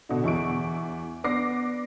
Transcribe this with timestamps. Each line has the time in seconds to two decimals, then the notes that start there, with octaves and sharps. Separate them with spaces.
0.09 B2 D3
0.24 E2 E4 C#6 D7
1.24 B3 D4 D6 A#6 C7